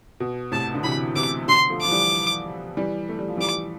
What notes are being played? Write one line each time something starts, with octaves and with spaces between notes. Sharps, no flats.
B2
A2 C3 A5
D3
C3 E3 B5
C3 E3 D6
B2 D3 C6
F3 A3
F3 D6
E3 G3
E3 G3
A3
G3
F3
E3 G3 D6